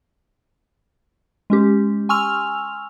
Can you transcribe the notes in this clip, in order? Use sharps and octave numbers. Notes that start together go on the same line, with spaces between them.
G#3 C#4 G4
G#5 C6 C#6 E6 F6 F7